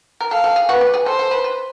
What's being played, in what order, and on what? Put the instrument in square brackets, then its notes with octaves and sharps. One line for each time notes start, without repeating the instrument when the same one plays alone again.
[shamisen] A#4
[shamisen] A4 [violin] F5
[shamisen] A4
G#4
[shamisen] F#4 [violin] B4
[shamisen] G4
G#4
[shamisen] A4 [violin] C5
[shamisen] A4
B4
B4